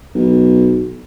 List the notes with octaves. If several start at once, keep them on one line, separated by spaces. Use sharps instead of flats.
B1